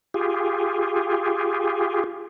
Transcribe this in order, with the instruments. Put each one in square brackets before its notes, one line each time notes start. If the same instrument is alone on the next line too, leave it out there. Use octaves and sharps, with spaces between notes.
[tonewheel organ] F4 G4 G#4